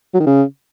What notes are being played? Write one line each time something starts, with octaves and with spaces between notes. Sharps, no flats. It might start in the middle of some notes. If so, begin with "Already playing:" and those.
F#3
D#3
C#3